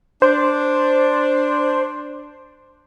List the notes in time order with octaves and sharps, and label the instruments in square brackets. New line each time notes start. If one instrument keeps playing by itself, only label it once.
[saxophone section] D4 [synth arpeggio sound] C5